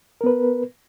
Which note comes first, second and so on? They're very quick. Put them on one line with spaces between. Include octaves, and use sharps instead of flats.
A#4 B3 B4